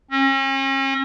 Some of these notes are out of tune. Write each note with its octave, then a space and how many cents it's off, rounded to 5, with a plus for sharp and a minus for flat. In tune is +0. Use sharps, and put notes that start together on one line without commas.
C#4 -40